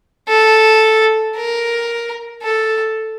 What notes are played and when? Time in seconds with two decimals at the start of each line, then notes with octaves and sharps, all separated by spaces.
0.28 A4
1.36 A#4
2.43 A4